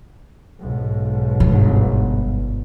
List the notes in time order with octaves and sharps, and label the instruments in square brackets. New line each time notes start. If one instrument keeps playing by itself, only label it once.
[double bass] B1 G#2
[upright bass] G1